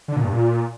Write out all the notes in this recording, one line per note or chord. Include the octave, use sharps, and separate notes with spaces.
D3
A#2
G2
A#2